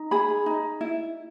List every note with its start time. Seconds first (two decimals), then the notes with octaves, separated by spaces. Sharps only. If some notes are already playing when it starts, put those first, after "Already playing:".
Already playing: D#4
0.11 G#4 B5
0.46 D#4
0.81 E4